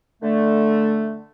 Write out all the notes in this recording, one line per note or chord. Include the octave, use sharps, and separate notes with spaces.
D3 A3